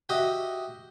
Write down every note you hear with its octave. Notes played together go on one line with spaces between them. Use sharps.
F#4 G4 D#5 E5